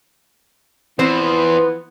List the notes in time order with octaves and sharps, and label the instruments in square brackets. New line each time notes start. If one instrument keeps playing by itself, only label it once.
[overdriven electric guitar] E2 [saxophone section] E3 F3 B3 [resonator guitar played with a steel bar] C4 C5